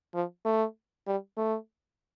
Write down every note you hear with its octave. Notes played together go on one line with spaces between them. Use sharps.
F3
A3
G3
A3